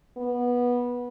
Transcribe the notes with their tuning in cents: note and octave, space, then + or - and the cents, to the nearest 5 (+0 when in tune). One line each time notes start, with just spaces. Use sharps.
B3 -15